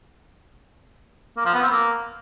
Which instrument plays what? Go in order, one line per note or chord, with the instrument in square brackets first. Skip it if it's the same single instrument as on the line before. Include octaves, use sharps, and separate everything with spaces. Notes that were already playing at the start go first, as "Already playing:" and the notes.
[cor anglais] A#3
F3
B3
C4
A#3